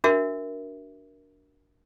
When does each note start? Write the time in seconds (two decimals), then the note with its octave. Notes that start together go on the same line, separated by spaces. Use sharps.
0.04 D4 F#4 A#4 E5